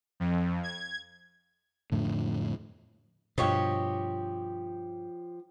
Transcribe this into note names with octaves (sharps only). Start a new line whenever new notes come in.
F2
G#6
F2 A2 D3
G2 B2 F3 G4 C#5 D#5